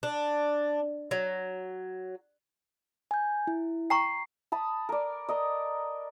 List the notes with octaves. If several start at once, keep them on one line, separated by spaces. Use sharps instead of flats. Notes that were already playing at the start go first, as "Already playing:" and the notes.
D4
F#3
G#5 G6
E4
G5 A#5 C#6 C7
A5 B5 D#6
A#4 D5
A#4 D5 D#5